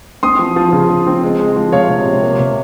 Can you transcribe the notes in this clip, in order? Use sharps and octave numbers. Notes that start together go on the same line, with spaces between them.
C4 C6 D#6
F3
F3
C#3
C#3
C4
G#3
G#3
F3
C3 C#5 F5
C3
C3
A#3
C3